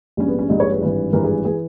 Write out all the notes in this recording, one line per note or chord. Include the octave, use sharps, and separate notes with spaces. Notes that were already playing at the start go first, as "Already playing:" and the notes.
A#1 G#2 G3 C#4
B3
C#4
A#1 G#2 G3 D#4
C#5
B4
G#1 G2 E3
G#1 G2 E3 A#4
G#4
E3 G#4